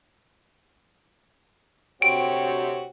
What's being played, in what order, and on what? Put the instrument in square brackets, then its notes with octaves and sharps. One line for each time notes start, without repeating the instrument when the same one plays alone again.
[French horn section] D2 C3 C#5 [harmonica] C4 F#4 G4 [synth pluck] D7